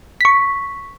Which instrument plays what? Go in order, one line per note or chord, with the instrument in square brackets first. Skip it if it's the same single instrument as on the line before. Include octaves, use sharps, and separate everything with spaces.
[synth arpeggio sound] C#6 B6